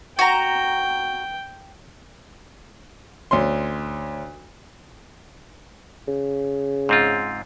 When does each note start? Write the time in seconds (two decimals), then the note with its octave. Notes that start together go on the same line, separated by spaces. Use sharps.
0.19 F#4 G5 A#5
3.31 D2 C#4 C6
6.08 C#3
6.89 G#2 C4 F4